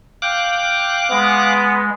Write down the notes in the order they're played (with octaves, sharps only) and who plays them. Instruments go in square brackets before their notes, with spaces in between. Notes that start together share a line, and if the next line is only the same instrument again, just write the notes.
[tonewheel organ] F5 D6 F#6 [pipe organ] G5
[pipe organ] G#3 [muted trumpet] B3